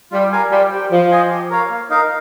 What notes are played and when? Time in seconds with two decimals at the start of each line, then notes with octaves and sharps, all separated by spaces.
0.11 G3 F4
0.32 A#4 F5 G#5
0.51 G3 F4
0.70 C5 G5
0.91 F3 F4
1.11 C5 D#5 G#5
1.31 G4
1.50 A#4 C#5 F5
1.70 A#3
1.90 D#4 A#4 F5